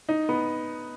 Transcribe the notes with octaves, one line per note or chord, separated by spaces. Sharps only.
D#4
B3